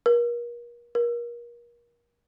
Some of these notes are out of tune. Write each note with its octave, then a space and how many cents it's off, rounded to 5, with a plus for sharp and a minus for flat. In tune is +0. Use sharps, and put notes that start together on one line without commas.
A#4 +35
A#4 +30